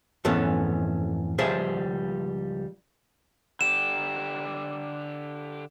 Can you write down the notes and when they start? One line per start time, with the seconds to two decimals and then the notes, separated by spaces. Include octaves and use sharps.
0.25 F2 G#2 E3 A3 B3 C#4
1.38 C#2 F3 G3 G#4 C5 E5
3.61 D3 G4 E7